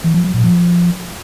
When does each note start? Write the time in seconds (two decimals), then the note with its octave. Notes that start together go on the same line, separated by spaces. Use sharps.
0.04 E3
0.14 F3
0.24 F#3
0.34 A#2
0.44 F3